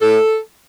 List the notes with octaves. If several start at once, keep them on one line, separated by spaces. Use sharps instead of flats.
A2 A4